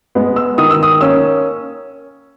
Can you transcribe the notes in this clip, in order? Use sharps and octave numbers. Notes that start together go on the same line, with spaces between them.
G#3 B3
E6
D#3 D#6
E6
D#6
A#3 C#4 E6